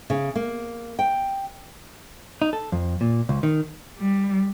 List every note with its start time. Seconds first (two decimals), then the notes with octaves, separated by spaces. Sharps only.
0.10 C#3
0.35 A#3
0.99 G5
2.42 D#4
2.53 A4
2.72 F2
3.01 A#2
3.29 C#2
3.43 D#3
3.98 G3